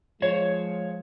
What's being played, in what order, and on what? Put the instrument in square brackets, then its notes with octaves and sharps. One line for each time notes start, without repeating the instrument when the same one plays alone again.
[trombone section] F3 G#3 [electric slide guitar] C5 C#5